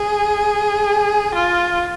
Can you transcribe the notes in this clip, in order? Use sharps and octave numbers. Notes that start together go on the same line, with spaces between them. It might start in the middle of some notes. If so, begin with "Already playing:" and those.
Already playing: G#4
F4